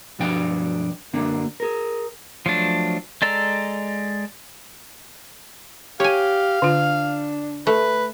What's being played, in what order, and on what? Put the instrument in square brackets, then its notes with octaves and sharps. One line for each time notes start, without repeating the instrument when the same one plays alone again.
[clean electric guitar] B1 G2 F3 D4 G5
F#2 D3 A#3 D4
G#4 A#4
[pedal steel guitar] F3 F#3 A3 D4
G#3 A4 D5 A#5 E6
[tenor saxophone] G4 [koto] C#5 G#5 [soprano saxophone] F5
[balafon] D3 F4 [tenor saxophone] D4
[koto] A3 [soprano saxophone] B4